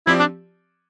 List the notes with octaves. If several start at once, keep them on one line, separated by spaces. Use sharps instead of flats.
F3 C4 E4 G4 D5
D4